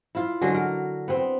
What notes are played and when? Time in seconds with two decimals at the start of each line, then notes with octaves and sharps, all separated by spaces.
0.15 E4 F4
0.41 D3 F#3 G#3
0.54 A#4
1.08 B3 C4